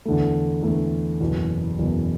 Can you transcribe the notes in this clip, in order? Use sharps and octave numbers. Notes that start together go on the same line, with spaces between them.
E2 D3 A3
E2 D3 A3
F#1 E2 B2
F#1 E2 B2